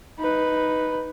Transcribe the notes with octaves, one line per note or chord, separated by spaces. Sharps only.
D#4 B4